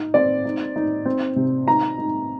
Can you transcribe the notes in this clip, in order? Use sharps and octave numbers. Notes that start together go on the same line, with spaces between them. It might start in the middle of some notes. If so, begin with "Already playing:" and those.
Already playing: D#4
C4 D5
D#4
D#4
C4
C3
D#4 A#5
D#4